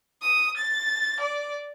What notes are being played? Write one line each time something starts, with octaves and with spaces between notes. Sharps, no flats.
D#6
A6
D5